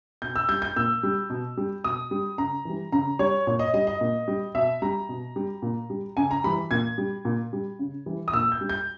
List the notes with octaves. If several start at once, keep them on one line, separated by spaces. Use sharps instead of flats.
B2 G6
E6
G3 G6
G6
A#2 E6
G3
B2
G3
B2 D#6
G3
C#3 A#5
E3 G3
C#3 A#5
G3 C#5
A#2 C#5
D#5
G3 D#5
D#5
A#2
G3
B2 E5
G3 A#5
B2
G3
A#2
G3
C#3 G#5
A#5
E3 G3 B5
A#2 G#6
G3
A#2
G3
C#3
E3 G3
D#6
A#2 E6
G6
G3
G6